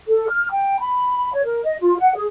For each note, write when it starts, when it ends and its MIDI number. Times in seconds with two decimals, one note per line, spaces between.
0.08 0.27 69
0.30 0.48 89
0.51 0.80 79
0.80 1.33 83
1.33 1.44 73
1.45 1.62 70
1.64 1.76 75
1.81 1.95 65
1.98 2.15 78
2.15 2.26 68